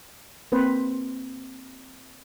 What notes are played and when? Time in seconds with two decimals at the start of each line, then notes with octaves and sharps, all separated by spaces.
0.52 A#3 C4 B4 C5